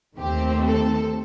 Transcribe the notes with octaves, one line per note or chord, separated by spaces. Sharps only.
D#2 D#3 A3 C4 G4
A4